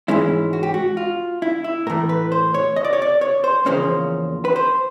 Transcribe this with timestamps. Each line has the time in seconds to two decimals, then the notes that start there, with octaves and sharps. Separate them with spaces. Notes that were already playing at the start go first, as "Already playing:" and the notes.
0.08 G#2 E3 G#3 C#4 E4
0.53 F#4
0.63 G4
0.74 F#4
0.97 F4
1.42 E4
1.64 E4
1.87 A2 E3 A3 A#4
2.09 B4
2.32 C5
2.54 C#5
2.76 D#5
2.84 D5
2.93 C#5
3.02 D5
3.21 C#5
3.44 C5
3.66 E2 C#3 F3 A#3 C#4 C5
4.45 B4
4.56 C5